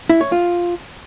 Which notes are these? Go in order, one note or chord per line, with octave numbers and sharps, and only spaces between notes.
E4
C#5
F4